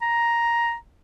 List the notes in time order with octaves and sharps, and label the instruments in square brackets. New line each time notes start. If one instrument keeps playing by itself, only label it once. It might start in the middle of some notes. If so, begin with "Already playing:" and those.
[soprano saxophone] A#5